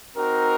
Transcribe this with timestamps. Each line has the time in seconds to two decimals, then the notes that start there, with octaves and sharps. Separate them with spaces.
0.16 C4 D#4 F#4 A#4